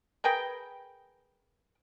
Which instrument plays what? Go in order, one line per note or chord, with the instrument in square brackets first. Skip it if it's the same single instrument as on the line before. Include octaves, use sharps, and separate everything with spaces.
[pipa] G#4 A#4 B4 G5